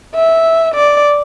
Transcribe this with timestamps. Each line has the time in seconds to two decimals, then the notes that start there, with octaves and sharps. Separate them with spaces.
0.15 E5
0.74 D5